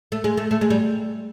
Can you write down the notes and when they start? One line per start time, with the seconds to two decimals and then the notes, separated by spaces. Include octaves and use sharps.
0.12 A3
0.24 G#3
0.37 A3
0.51 A3
0.61 G#3
0.70 G3